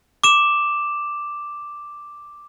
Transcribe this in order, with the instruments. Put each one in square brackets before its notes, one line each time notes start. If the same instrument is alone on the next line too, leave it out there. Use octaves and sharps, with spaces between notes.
[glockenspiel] D6 E7